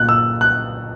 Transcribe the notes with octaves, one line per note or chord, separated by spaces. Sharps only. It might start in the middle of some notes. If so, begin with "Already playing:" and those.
Already playing: A#2 A#3 F#6
E6
F#6